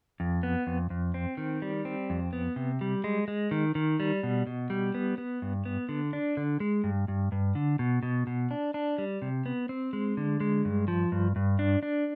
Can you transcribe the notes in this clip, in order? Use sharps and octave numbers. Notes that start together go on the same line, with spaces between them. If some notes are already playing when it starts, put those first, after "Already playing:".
F2
B3
F2
F2
C4
D#3
G3
C4
F2
B3
C3
G3
G#3
G#3
D#3
D#3
G3
B2
B2
G3
B3
B3
G2
B3
D3
D4
D3
G#3
G2
G2
G2
D3
B2
B2
B2
D4
D4
G3
C3
B3
C4
G#3
D3
G#3
G2
F3
G2
G2
D4
D4